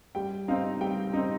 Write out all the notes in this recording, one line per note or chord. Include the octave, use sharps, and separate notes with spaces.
G3 G5
C4 D#4 F5
G3 G5
C4 D#4